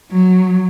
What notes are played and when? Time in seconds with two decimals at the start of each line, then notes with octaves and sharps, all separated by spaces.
0.11 F#3